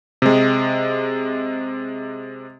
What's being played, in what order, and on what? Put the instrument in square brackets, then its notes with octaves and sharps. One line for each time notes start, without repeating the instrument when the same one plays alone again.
[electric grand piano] C3 G#3